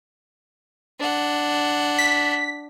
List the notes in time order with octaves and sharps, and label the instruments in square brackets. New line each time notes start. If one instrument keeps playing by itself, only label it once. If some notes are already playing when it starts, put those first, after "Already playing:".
[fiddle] D4 F#5
[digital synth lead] B6